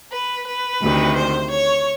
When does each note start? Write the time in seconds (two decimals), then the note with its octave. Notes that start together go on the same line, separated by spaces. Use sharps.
0.14 B4
0.48 B4
0.82 D2 C3 D#3
1.17 C5
1.51 C#5